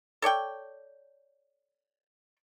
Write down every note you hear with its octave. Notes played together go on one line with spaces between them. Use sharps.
A4 C#5 D5 G5